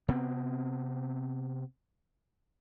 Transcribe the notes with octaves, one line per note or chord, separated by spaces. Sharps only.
C3 B3 C4